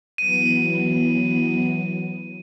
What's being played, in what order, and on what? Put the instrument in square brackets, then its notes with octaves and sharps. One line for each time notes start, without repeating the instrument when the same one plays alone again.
[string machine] E3 F#3 B3 [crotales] D#7